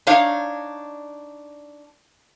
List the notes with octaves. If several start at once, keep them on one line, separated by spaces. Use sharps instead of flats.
D4 D#4 C#5 F5